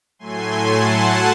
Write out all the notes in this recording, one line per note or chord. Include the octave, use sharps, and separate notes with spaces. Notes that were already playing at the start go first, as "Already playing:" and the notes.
A2 F#3 A3 G#5 C6
F#5 A5